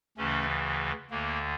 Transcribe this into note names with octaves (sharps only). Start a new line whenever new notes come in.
D2 C#3 E3 A3 C#4
D2 D3 A#3